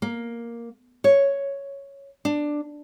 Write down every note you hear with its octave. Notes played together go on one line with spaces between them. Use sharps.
A#3
C#5
D4